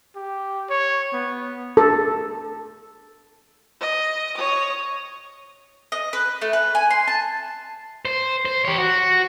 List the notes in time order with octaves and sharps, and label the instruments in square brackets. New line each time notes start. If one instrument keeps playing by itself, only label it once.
[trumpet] G4
C#5
B3
[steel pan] A4
[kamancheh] D#5
C#5 D#6
[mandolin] D#5
B4
A3
B4
G#5
C6
A5
[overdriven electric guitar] C5
C5
G4 C#5
F#4